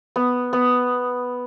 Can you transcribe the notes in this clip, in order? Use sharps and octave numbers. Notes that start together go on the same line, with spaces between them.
B3
B3